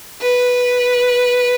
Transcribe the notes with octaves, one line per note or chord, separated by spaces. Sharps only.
B4